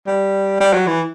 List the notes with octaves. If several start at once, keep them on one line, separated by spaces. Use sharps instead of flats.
G3
G3
F#3
E3